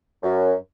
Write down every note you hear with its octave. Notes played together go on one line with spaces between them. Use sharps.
F#2